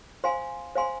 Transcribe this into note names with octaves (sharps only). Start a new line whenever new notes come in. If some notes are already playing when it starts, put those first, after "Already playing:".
C5 F5 G#5 C6
C5 F5 G#5 C6